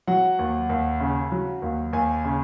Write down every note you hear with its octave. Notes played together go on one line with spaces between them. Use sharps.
F#3 F#5
D#2
D#2
C#3
F#3
D#2
D#2 G#5
C#3